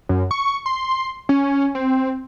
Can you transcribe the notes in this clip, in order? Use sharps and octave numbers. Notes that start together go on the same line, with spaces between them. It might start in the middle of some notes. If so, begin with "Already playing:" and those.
F#2
C#6
C6
C#4
C4